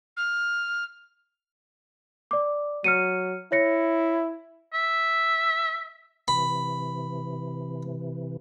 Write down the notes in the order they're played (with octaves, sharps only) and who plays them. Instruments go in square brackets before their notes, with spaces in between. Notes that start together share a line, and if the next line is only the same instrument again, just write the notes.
[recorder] F6
[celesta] D5 D6
[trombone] F#3 [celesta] F6 C#7 D#7
[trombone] E4 [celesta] C#5 A#6 C#7
[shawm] E5
[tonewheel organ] C3 E3 [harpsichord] B5